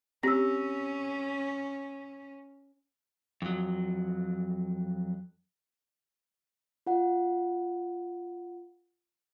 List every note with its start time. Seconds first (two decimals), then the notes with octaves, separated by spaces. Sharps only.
0.23 C4 C#4 G4 E6 A#6
3.42 F2 F#3
6.86 F4 F#5